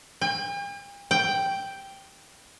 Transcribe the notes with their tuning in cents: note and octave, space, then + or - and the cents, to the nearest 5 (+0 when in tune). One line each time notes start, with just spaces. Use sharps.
G5 +45
G5 +0